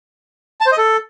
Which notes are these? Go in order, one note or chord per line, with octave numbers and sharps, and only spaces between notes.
A5
C5
D#5
A4